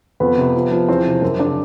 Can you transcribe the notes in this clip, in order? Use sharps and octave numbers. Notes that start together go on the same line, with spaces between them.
F2 B3 B4
C3
F3
F3
E2 C4 C5
C3
F#2
C#3 D4 D5